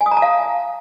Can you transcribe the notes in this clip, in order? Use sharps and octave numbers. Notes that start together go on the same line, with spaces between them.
G#5
D#6
A#5
A5
F5